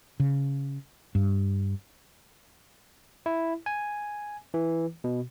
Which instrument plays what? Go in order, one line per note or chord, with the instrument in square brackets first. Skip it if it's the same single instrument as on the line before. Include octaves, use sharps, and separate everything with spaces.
[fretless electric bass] C#3
G2
[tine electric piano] E4
G#5
E3
B2